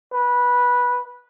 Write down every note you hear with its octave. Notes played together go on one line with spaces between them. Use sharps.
B4